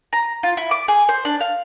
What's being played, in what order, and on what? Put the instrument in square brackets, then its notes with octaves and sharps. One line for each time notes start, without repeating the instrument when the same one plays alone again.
[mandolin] A#5
F4
E4
D6
G#4
C5
D4
F5